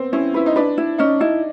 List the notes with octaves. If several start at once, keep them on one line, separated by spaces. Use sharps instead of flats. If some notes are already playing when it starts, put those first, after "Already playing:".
Already playing: B3 C4
C#4 E4
E4 B4
D#4
D4 B4
E4
C#4 D#4
D#4 E4